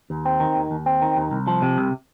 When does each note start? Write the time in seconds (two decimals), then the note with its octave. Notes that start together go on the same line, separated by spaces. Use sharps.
0.10 D#2
0.25 C4
0.40 D#3
0.56 D#2
0.71 D#2
0.86 C4
1.02 D#3
1.16 D#2
1.31 C2
1.47 F3
1.62 C3
1.78 C2